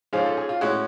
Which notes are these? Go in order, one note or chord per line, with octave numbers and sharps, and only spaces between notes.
G#2 F3 G#3 C#4 F5
A4
G#4
F4
A2 G#3 C#4 F#4